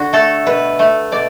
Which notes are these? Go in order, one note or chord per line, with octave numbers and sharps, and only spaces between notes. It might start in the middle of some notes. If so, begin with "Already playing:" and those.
Already playing: D3 F#4
A3 A4
B2 B4
A3
B2 D5